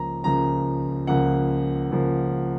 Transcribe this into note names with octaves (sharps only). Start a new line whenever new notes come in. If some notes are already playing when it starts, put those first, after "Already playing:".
Already playing: C#2 C#3 F3 A#3 A#5
C#2 C#3 F3 A#3 A#5
C#2 C#3 F3 A#3 F#5
C#2 C#3 F3 A#3